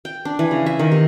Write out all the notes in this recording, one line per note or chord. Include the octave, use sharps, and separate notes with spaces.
G5
D4
E3
C#3
E5
D#3
C3